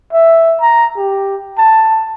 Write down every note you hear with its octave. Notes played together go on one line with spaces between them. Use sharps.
E5
A#5
G4
A5